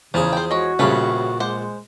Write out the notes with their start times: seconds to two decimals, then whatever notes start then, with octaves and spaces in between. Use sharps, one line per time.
0.14 E2 C#3 F3 G#4
0.33 C5 G5
0.51 G#3 F#4 C#5
0.79 A#1 C#3 G3 A3 C4 C#4 B4
1.40 G#3 C5 F#5 D6